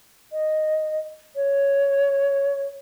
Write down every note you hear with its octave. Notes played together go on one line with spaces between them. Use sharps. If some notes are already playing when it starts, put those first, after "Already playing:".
D#5
C#5